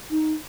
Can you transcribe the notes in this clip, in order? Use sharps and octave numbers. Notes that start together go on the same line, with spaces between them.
D#4